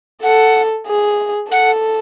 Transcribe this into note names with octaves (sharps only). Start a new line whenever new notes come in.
A4 F#5
G#4
A4 F#5